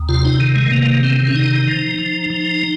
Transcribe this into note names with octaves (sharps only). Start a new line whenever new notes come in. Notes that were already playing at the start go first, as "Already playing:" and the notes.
Already playing: D#2
C3 F4
D#4
D#3
G#3
C3 A#3
D#3 C4
C4
C#4
C3 D#4
F3
F3
F3